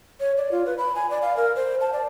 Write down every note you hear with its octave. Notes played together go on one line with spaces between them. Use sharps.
C#5
D5
F4
B4
B5
G#5
D5
F5
A#4
C5
A5
D5